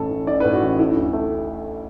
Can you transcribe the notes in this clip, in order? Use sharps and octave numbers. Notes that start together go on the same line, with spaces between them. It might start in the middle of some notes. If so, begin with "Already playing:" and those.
Already playing: A1 A2 A4
E3
A1 D5
A2 B4
F#4
A1
A3 E4
D2
A3